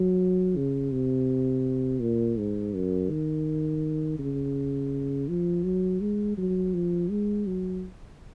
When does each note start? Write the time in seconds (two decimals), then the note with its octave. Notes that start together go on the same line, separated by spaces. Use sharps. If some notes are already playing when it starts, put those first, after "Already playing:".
Already playing: F#3
0.56 C#3
0.93 C3
2.01 A#2
2.38 G#2
2.74 F#2
3.10 D#3
4.19 C#3
5.29 F3
5.64 F#3
6.01 G#3
6.37 F#3
6.74 F3
7.10 G#3
7.47 F#3